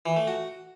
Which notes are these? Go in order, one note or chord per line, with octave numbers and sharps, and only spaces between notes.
E3
A3
F#4